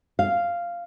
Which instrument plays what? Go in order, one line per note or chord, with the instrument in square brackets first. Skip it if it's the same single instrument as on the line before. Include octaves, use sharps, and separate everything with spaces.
[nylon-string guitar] F5